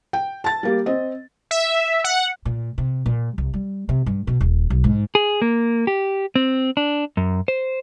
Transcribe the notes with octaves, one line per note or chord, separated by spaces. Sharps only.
G5
A5 A6
G3 A#3 G4
C4 D#5
E5
F#5
A#2
C3
A#2
C2
G3
C3
G2
B2
D#1
B1
G#2
G#4
A#3
G4
C4
D4
F#2
C5